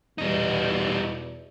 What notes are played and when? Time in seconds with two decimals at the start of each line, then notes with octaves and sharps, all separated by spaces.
0.18 E2 B2 G3 D#4